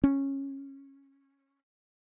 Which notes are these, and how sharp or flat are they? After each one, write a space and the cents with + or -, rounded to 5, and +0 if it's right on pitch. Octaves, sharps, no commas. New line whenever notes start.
C#4 -15